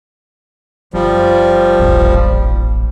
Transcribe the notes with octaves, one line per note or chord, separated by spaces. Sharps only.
F#1 F3 G3
D#1 A1